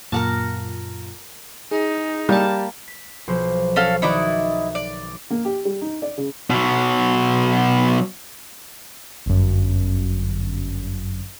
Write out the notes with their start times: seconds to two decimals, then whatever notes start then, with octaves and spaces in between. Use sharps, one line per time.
0.12 F#2 A#2 F4 A#4 F#5 A5
1.71 D#4 G#4
2.29 G3 A#3 A5
2.88 B6
3.28 B1 F3 C5
3.76 C#4 A4 F5
4.02 D#3 D#4 E4 F#4 D5
4.75 D5
5.31 A#3
5.45 G4
5.65 G3
5.82 D#4
6.02 D5
6.17 C#3
6.50 B2 F#3
9.26 G1 F#2